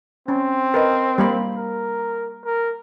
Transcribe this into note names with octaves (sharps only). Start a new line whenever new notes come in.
C4 C#4
A#4 B4 D#5
G3 A#3 B5
A#4
A#4